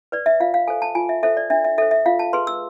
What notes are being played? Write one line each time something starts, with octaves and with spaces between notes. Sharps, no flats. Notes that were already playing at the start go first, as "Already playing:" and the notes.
B4 D5
E5
F4 F5
F5
A4 C5 G#5
A5
F4 G#5
E5
A4 C5 E5
D5
D4 E5
E5
A4 C5 E5
E5
F4 F5
A5
G#4 B4 C6
E6